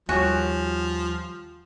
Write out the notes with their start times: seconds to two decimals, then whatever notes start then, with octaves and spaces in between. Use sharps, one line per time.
0.09 D#2 F3 G3 F#4 G4 C#5 G#5